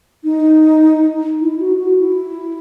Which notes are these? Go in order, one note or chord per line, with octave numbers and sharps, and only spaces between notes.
D#4
E4
F#4
F#4
E4